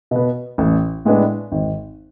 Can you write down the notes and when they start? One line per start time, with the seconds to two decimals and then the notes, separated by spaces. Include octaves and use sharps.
0.11 B2 B3
0.58 A1
1.05 A2 G#3 B3 D4
1.52 G#1